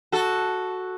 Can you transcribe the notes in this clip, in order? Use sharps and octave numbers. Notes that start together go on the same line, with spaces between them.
F#4 A4